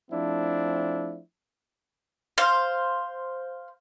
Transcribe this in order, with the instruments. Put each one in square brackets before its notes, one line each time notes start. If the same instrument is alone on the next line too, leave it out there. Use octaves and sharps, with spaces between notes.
[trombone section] F3 A3 C4 D4 E4
[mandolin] C5 F5